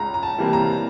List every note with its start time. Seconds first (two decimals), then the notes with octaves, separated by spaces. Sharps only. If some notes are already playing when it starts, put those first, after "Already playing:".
Already playing: C#2 A#5
0.14 A#5
0.23 A5
0.38 C3 E3 G3 A#3
0.53 A#5